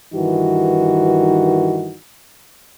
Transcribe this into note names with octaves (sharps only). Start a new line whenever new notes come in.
G2 D#3 E3 D#4 F#4